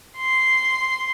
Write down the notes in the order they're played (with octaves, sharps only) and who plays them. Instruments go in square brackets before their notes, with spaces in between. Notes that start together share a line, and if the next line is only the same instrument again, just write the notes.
[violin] C6